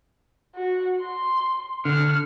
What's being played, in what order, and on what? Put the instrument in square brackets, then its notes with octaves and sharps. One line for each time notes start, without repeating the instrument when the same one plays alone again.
[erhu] F#4
C6
[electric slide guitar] D3 [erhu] F6